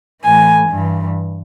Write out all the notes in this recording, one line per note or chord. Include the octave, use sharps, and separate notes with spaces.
A2 E3 G#5
G2 E3